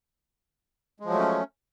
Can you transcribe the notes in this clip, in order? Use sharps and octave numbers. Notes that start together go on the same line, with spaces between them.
F3 F#3 G#3 A3 C#4